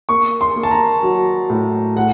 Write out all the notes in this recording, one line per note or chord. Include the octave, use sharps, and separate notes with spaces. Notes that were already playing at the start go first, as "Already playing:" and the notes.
A#3 C#6
C6
A#3
A5
A#5
F#3
A2
A2 F#5